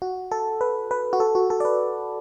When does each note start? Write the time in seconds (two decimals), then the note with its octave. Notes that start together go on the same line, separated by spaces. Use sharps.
0.02 F#4
0.32 A4
0.61 B4
0.91 B4
1.13 F#4
1.20 A4
1.35 F#4
1.50 A4
1.60 D5
1.65 B4